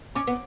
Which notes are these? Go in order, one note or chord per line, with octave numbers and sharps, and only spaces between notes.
C#4 D6
B3